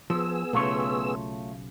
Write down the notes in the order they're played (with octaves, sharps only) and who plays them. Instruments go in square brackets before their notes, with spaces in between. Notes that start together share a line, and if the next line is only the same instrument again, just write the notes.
[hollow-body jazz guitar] F3 [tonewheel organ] B3 G#4 E6
[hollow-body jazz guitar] B1 C#3 [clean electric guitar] A3 F4 C#5